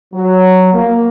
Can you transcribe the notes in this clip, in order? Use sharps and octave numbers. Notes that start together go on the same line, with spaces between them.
F#3
A#3